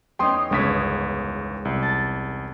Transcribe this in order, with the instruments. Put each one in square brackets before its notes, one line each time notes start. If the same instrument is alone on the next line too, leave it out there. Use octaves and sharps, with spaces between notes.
[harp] E2 C#4 D#4 [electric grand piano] G5 C6 D#6
[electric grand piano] G1 C#2 B6 [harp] G#3 C#4
[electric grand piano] C2
[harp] A5